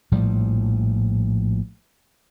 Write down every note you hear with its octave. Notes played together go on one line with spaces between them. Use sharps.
A#1 A2 F3 G3